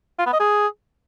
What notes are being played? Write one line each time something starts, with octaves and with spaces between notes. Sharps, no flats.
F4
B3
D#5
G#4